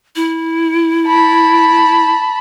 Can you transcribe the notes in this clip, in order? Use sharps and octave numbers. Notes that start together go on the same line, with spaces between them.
E4
A5 B5